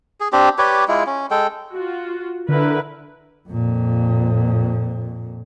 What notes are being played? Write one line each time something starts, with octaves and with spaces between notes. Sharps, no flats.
G#4
C4 D4 G4
G4 B4 C#5 D5
G#3 E4 F4
C#4
G#3 A4 G5
F4 F#4
D3 E4 A#4 B4
F2 A#2